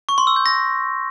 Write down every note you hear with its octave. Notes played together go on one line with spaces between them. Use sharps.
C#6
C6
E6
G6
A#6